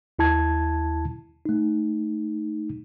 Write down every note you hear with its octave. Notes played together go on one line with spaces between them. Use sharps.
D#2 E4 A5 G#6
A3 D#4